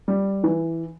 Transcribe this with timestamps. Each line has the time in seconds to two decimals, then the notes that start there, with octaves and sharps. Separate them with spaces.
0.08 G3
0.44 E3